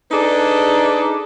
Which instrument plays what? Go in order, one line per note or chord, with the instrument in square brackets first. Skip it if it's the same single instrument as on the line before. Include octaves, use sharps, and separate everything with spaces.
[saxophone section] D4 D#4 G#4 A4 B4 D5